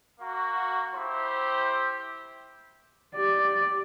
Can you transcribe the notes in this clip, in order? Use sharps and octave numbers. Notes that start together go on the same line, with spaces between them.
A#3 F#4
E4 G4 C5
G4 D5